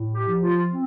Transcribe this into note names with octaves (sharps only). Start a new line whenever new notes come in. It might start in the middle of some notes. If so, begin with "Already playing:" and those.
Already playing: A2
G4
F3
F4
C4